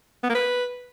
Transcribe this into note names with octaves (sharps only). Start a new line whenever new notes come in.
B3
A#3
B4